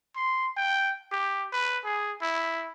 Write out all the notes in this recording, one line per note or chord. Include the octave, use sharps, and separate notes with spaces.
C6
G5
G4
B4
G#4
E4